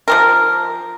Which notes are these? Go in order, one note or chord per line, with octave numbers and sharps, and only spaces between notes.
F3 G4 A#4